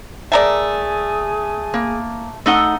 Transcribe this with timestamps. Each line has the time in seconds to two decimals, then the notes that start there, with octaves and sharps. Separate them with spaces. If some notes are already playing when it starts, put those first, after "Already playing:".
0.32 A3 G#4 A#4 D5 G#5
1.74 A#3
2.46 A3 D#4 F#5